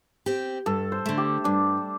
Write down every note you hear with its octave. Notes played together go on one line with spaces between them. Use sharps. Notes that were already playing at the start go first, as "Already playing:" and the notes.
C4 G4
G2 A4
C5
D3 A3
G4
G2 D4